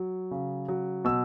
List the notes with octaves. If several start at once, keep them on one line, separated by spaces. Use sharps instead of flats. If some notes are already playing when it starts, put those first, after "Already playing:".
Already playing: F#3
C#3
F#3
B2 E6